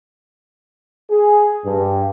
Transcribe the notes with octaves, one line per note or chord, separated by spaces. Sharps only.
G#4
G2